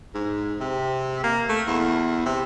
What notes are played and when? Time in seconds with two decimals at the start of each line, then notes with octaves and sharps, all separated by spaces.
0.15 G#2
0.60 C3
1.24 A#3
1.49 A3
1.67 E2
2.26 C3